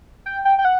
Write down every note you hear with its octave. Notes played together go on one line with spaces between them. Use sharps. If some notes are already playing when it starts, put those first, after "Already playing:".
G5
G5
G5
F#5